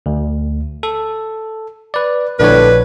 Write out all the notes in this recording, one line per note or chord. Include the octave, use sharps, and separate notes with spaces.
D2
A4
B4 D5
A#1 A2 D3 B4 C#5